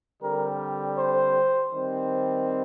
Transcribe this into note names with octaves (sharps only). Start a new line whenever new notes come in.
D3 G3 C4 A#4
C5
D#3 G3 C4